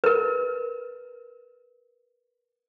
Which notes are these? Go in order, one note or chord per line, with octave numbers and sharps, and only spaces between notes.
A#4 B4